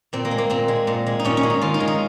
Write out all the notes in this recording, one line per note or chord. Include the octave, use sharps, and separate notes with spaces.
A#2 C4
A#3
G#3
A#3
A#2 C4
G#3
A#2
G#3
D#4
A#2 C#4
C#4
G#3
D#4
D#3 F4
D#4
G#3
D#4